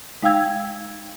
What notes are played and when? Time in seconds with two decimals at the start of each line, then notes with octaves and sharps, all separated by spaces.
0.22 G#3 D#4 F5 G5 E6 G#6